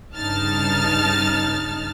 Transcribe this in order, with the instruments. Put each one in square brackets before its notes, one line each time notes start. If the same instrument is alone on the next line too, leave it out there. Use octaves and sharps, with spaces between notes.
[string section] G2 C#3 D#4 A5 F6 A6